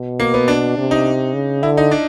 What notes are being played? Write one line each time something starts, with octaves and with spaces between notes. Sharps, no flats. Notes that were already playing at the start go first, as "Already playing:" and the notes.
Already playing: B2
A#3
B3
D4
C3
D#4
C#3
D3 E4
D#4
D4